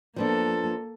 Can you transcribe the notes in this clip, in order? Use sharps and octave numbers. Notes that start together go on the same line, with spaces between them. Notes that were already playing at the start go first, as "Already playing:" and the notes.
F3 A#3 B3 D4 A4